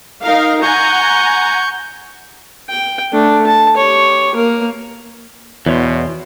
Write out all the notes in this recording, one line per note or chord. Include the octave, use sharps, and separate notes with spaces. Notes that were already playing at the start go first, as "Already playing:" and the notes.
D#4 A#4 F5
F#5 G#5 A#5 C#6 G6
G5
A3 D4
A5
G4 C#5
A#3 A#4
E2 B2 E3 C#5 C6